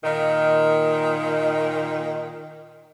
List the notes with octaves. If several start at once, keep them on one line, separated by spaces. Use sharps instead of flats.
A#2 D#3